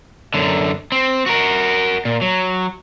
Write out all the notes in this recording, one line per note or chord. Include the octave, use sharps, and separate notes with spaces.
F#2 D3
C4
F#4 A#4
A#2
F#3